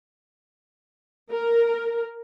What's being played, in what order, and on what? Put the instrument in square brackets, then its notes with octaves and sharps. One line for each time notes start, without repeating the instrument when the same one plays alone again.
[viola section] A#4